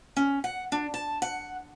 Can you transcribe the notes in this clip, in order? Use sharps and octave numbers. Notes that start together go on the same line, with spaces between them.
C#4
F#5
D4
A5
F#5